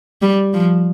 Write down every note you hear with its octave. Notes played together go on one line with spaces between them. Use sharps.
G3
F3